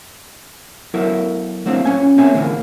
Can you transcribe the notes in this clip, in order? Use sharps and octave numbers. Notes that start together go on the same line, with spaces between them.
F#3 B3 E4 A4 A#4 E5
F#3 A#3 C4 D4 E4
A#2 C#4 G#5
A#3 C4 G#4 C#5 E5 G#5
A#2 D3 E3 F3 G#3 A#3